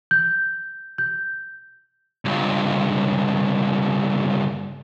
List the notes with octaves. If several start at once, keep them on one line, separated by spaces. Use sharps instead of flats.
G6
G6
C#2 G2